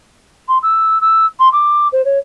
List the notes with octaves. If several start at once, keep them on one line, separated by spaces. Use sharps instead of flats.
C6
E6
E6
C6
D6
C5
C#5